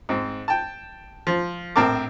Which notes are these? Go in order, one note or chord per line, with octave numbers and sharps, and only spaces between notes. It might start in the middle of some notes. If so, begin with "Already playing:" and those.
G#2 C4
G5 A5
F3
A#1 A2 C4 A#4 A5 D6